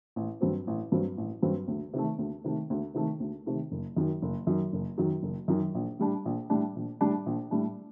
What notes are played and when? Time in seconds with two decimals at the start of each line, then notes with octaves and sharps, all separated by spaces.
0.16 A1
0.41 G2 F#3 C4
0.67 A1
0.92 G2 F#3 C4
1.17 A1
1.42 G2 F#3 C4
1.68 D2
1.93 C3 D#3 A3
2.19 D2
2.44 C3 D#3 A3
2.70 D2
2.94 C3 D#3 A3
3.20 D2
3.46 C3 D#3 A3
3.72 F#1
3.96 F#2 D#3 F#3
4.22 F#1
4.47 F#2 D#3 F#3
4.73 F#1
4.98 F#2 D#3 F#3
5.23 F#1
5.48 F#2 D#3 F#3
5.75 A#1
5.99 A2 G3 D4
6.25 A#1
6.50 A2 G3 D4
6.76 A#1
7.01 A2 G3 D4
7.26 A#1
7.51 A2 G3 D4